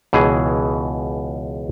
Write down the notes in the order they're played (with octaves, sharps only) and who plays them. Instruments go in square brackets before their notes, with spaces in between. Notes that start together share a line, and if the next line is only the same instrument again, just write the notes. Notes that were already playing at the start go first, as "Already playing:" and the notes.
[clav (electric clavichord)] C#2 B2 E3 G#4